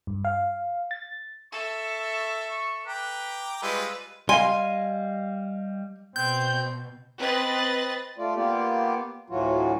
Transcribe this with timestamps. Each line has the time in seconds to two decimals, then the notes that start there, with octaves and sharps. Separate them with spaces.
0.07 G2
0.25 F5
0.91 A6
1.52 A4 E5 C#6
2.49 C#6
2.87 B4 G5 A#5 D6
3.62 G3 G#3 F4 B4 E6
4.29 G3 D#5 F5 G#5 C6
6.16 B2 C4 G6
7.18 C4 B4 D#5 A6
8.18 A3 F4 D5
8.36 A#3 B3 F4 G4 D5
9.30 D2 A2 E3 F#3 F4 F#4